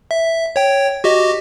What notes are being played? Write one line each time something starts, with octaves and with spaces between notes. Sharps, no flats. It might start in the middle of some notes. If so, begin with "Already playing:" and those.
E5
C#5 G5
F#4 G4 D#5